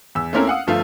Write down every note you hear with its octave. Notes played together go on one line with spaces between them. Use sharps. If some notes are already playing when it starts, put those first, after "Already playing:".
E2 E6
A3 A#3 C4 C#4 E4 A#4
F5 F#5 D#6
G1 F3 A3 F4 F5